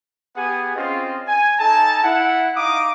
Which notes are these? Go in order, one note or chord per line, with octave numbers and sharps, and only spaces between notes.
B3 G4 G#4 F#5 G#5
C4 C#4 F4 G#4 C5 D#5
G#5
D#4 A4 G#5 A5
E4 F#5
D#4 F5 D6 D#6